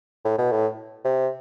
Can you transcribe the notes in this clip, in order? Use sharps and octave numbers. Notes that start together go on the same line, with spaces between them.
A2
B2
A2
C3